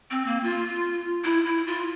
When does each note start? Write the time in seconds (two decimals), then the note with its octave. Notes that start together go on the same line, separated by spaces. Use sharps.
0.11 C4
0.26 A#3
0.43 F4
1.24 E4
1.46 E4
1.67 F4